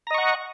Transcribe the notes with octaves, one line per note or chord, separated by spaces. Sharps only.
D#5 F#5 A#5 C#6